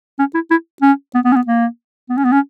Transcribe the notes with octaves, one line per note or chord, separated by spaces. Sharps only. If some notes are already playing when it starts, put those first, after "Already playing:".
C#4
E4
E4
C#4
B3
B3
C#4
B3
A#3
B3
C#4
B3
C#4